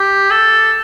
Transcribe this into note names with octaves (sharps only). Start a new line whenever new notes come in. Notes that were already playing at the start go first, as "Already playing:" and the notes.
Already playing: G4
A4